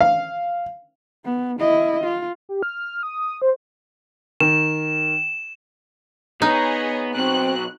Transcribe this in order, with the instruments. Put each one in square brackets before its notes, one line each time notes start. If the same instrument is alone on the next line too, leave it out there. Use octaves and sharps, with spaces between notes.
[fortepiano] F5
[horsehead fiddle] B3
E4 D#5
F4
[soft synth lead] G4
F6
D#6
C5
[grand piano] D#3 [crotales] E7
[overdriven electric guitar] B3 [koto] D#4 [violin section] G#4 C#5 D#5
[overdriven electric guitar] B2 F#3 [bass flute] C4 [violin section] F#6